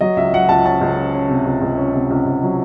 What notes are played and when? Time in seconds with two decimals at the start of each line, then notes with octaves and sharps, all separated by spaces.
0.01 F#3 D#5
0.17 C#2 E5
0.33 F#3 F#5
0.49 C#2 A5
0.65 C#4 A5
0.81 C#2
0.97 C#4
1.14 C#4
1.29 C3
1.45 C#2
1.61 C#2
1.77 C#4
1.94 C3
2.10 C#2
2.26 C#2
2.43 F#3